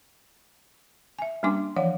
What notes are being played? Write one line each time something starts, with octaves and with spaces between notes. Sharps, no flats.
E5 G#5
G3 A#3 C#4 D4 G#5 D6
E3 F3 C#5 D5 F5 F#5